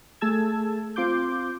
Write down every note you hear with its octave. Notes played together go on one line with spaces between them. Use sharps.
A3 G#4 A5 E6 G#6
C4 F4 C6 D6 G6